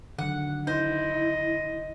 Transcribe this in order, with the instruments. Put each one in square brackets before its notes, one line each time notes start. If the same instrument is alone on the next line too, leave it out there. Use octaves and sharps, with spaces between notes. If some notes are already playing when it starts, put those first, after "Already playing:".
[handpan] D3 D#3 F#3 [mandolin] F#5
[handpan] D#4 [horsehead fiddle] E4 [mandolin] C5 [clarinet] D#5